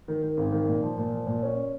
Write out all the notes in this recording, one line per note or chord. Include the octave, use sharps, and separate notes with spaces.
D#3
D#3
G#1
D#3
A#2
F3
A#2
F3
A#2
C#4